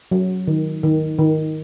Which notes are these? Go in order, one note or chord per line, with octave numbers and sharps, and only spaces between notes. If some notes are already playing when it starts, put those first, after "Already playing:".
F#3
D#3
D#3
D#3